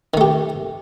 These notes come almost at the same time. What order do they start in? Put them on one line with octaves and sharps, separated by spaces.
D#3 A3 G4